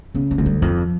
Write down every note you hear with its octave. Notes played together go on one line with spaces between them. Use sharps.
C#3 B3
B3
D2 G#3
G3
F2 F3